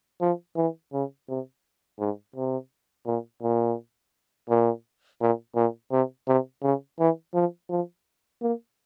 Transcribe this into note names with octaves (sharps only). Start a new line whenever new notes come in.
F3
E3
C#3
C3
G#2
C3
A#2
A#2
A#2
A#2
A#2
C3
C3
C#3
E3
F3
F3
A#3